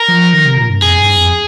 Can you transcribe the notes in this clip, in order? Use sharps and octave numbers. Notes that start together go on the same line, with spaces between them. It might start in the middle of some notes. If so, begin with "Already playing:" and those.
Already playing: A#4
F3
D#3
C3
A#2
G2
F2 G#4
G2
F2